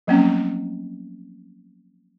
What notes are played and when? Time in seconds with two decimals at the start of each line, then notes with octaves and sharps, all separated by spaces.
0.07 F3 F#3 A3 A#3 C4 C#4